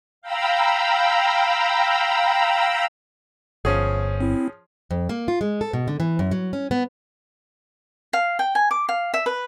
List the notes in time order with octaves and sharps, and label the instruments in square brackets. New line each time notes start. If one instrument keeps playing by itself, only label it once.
[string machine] F5 G5 A#5 B5 E6
[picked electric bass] G1 [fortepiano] F3 C#4 G#4
[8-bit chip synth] C4 E4
[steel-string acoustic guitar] F2
A#3
F4
G#3
A4
B2
D3
E3
F#2
F#3
C#4
B3
[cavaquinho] F5
G5
G#5
D6
F5
E5
B4